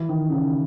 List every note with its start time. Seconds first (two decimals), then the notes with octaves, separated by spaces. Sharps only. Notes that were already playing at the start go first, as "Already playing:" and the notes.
Already playing: E3
0.09 D#3
0.30 C#3
0.34 D#3